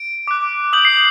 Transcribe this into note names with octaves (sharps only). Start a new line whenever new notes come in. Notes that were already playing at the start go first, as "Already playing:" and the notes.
Already playing: D7
D6 F#6
D#6 G6 F#7
C7